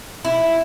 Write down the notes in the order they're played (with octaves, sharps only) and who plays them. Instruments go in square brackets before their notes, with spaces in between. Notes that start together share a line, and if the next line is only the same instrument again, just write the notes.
[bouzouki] E4